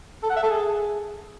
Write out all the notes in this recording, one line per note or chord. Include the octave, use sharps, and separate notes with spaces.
A4
F#5
E5
A4
G#4